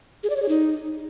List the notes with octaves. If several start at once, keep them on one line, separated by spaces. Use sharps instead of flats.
G#4
D5
C#5
G#4
D#4